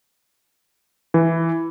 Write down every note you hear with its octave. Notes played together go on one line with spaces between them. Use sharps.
E3